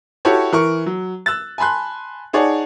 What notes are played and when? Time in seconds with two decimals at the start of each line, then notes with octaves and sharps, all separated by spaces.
0.25 E4 F#4 G4 A4 C#5
0.53 E3 A#4 C#6
0.86 F#3
1.26 E6 F#6 A6
1.58 G#5 A5 B5 C6 F#6
2.33 D#4 G#4 C#5 D5 F#5 A5